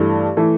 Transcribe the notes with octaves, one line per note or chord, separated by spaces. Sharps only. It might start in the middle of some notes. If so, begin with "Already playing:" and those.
Already playing: G2 E3 A3
E3 A3